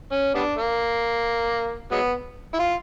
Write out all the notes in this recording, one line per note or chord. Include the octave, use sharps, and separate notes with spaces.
C#4
G3 B3 D4
A#3
F#3 G#3 B3
E4
F4